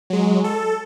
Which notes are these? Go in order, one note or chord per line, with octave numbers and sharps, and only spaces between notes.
F#3 G#3
A4